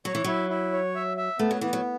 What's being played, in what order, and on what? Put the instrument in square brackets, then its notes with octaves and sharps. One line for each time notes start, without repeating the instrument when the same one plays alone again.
[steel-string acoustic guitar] F#3 [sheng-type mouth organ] C#5
[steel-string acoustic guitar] E3
[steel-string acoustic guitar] F#3 [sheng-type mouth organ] E4
[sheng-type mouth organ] E4
C#5
E5
E5
[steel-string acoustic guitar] A3 [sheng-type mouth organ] B3
[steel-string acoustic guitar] F#3
[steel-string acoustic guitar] E3 [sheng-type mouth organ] B3
[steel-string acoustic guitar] F#3